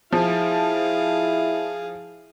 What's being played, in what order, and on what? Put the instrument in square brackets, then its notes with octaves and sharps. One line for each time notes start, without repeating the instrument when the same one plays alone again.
[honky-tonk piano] F3 [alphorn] E4 [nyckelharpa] G#4 F5